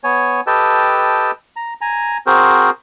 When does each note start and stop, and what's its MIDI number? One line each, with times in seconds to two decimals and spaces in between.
0.04 0.41 59
0.04 0.41 73
0.04 0.41 80
0.47 1.31 67
0.47 1.31 69
0.47 1.31 71
0.47 1.31 75
0.47 1.31 79
0.47 1.31 81
1.56 1.74 82
1.81 2.18 80
1.81 2.18 82
2.26 2.70 60
2.26 2.70 66
2.26 2.70 68
2.26 2.70 70
2.26 2.70 72